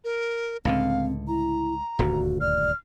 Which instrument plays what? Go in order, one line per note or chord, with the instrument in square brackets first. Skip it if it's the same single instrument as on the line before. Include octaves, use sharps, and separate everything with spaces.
[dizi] A#4
[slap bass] C#2 A2 D3 [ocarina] C4 [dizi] F5
[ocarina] E4 [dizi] A#5
[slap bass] D#1 D2 G2 [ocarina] F#4
[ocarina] D5 [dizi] F6